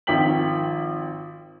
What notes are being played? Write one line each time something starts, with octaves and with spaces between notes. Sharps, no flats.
G#1 D#3 F3 G5 B6 F#7